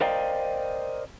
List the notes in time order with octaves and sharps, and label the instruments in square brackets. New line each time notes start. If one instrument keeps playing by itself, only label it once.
[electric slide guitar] A#4 C5 D5 D#5 F5 G5